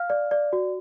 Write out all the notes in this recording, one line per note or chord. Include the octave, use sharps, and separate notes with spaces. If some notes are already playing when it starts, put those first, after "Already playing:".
Already playing: F5 F6
D5
D5
F#4